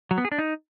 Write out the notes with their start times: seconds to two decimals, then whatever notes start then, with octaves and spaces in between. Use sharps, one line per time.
0.11 F#3
0.18 B3
0.25 G#4
0.32 D4
0.38 D#4